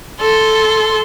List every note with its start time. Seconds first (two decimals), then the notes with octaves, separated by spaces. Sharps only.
0.20 A4 C6